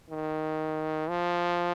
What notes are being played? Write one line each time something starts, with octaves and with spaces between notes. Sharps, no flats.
D#3
F3